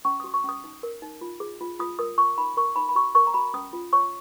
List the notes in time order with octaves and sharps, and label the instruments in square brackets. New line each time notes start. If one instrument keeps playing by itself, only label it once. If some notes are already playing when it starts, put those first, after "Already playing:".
[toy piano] C#4 C#6
F#4 D#6
C#6
C#4 D#6
D#4
A#4
D#4
F4
G#4
F4
F4 D#6
A#4 D#6
F4 C#6
D#4 B5
A#4 C#6
D#4 B5
B5
F#4 C#6
A#4 C#6
A#5
F#4 B5
C#4 D#6
F4
C#5 C#6